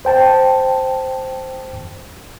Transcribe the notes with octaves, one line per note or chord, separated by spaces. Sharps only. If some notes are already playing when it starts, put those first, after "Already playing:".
C5 G5 A5